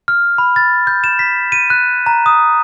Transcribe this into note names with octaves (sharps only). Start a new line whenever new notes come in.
F6
B5
A6
G6
E7
B6
D#7
F#6
A#5
D#6